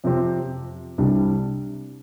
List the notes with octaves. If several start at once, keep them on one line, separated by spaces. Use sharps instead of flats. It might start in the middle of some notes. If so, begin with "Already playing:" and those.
F2 C3 F3 C4 G4
C2 C3 G3 D4